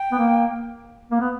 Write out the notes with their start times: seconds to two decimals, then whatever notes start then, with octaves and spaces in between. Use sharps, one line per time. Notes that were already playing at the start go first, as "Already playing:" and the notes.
Already playing: G5
0.12 B3
0.18 A#3
1.11 A#3
1.20 B3